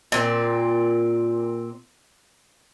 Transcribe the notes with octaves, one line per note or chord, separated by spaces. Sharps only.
A#2 C4